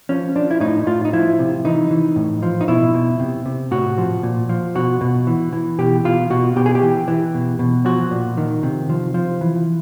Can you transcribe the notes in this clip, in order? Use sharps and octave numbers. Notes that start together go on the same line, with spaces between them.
F3 C#4
F3 D4
E4
A2 D#4
A2 F4
D#4
F3 E4
C3
E3 D#4
E3
A2
F3
D#4
B2 E4
B2
C3
C3
A2 F#4
F3
A#2
F3
B2 F#4
B2
E3
E3
B2 G4
B2 F4
B2 F#4
B2 G4
G#4
G4
E3
E3
B2
B2
F3 F#4
A#2
D#3
C3
F3
F3
E3